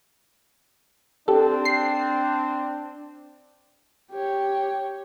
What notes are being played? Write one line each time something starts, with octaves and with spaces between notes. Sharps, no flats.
C4 D4 G4 A4
C7
G4 C#5